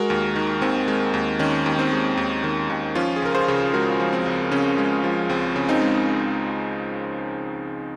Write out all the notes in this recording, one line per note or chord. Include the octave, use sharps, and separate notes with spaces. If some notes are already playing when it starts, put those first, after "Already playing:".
Already playing: G#3 F#4 A#4
D#2
D#3
D#2 C4
G#3
D#2
D#3 C#4
D#2
C4 D#4
G#3
D#2
D#3
D#2
F3 C#4 F4
G#4
C#2 A#4
G#4 C5
C#3
G#3 F#4 A#4
F3
C4
C#2
C#3 C#4
G#3
F3
C#2 C4
C#3
C4 D#4
G#3